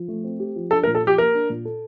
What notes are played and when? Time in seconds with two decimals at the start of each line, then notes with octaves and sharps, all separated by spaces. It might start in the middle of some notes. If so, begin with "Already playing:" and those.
Already playing: F3
0.08 A3
0.24 C4
0.40 G4
0.56 F3
0.71 D4 A4
0.83 A#4
0.87 A#2
0.95 A4
1.03 F3 G4
1.18 A#3 A#4
1.34 D4
1.50 A#2
1.65 A4